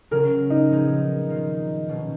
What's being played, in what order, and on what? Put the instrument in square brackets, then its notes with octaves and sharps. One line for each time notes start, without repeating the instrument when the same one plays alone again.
[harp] C#3 F#3 C#4 [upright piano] A#4
[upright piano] D#4
[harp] A#2 F3 B3 D#4 G#4
D#3 A#3 F4
B2 F#3 A#3 C#4